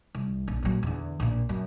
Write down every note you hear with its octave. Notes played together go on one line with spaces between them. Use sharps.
C2
A#1
A#2 F#3
E2 D3
A#1 A#2
F#2